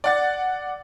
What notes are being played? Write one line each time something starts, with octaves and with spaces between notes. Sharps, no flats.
D5 F#5 A6